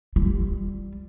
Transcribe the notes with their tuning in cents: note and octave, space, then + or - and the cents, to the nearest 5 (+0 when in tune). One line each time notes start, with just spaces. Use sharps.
G3 +0 F4 -30